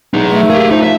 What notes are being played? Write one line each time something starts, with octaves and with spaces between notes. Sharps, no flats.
E2 F#3 D#4
A3
A#3 G4 G#4
F3 D#4
F3 E5